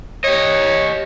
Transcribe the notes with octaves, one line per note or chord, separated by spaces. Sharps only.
G4 C#5 D#5